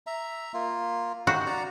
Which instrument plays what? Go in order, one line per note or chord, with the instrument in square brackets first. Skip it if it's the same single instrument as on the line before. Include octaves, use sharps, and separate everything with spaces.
[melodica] E5 A#5
A#3 F4
[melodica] D#4 G4 [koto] F#4
[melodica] D5 F#5 A#5